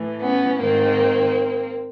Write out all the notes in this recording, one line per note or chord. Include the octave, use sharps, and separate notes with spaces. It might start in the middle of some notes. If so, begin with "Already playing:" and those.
Already playing: A2 E3
B3 C#4
G#2 D#3 A#3 C4